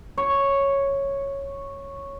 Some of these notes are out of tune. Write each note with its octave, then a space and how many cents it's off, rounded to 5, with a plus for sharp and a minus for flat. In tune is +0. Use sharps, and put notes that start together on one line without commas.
C#5 -5